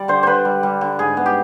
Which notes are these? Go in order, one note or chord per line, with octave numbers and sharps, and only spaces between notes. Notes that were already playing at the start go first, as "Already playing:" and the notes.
Already playing: G3 D5
D3 C5
D3 B4 C5
G3
G3
D3
G#2 G#4
B3
G4